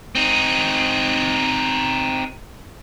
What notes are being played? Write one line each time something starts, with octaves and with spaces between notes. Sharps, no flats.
C4 D#4